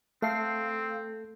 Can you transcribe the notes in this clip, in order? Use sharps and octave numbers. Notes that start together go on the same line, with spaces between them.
A3 C4 A4 F5 C7